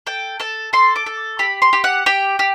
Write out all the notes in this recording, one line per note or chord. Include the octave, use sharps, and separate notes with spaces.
A4 G5
A4 A5
A4 C6
D6
A4
G4 B5
C6
G4
F#5
G4 G5
G4